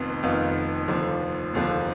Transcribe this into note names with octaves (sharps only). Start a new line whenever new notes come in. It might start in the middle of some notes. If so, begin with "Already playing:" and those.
Already playing: F1 F2 D#3 B3 F4
F1 F2 D#3 B3 F4
F1 D#2 D3 F3
F1 D#2 D3 F3